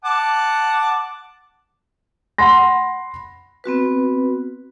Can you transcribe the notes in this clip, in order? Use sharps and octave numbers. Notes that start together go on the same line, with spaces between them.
F#5 A5 D6
F#5 B5 C6 A#6
B3 C4 F#4 B4